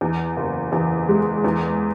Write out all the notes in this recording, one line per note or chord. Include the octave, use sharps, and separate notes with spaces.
E2
F#1
E2
G#3
E2